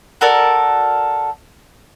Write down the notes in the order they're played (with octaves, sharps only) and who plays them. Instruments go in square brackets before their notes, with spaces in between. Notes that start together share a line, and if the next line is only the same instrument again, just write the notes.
[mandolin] F#4 A4 A#4 D5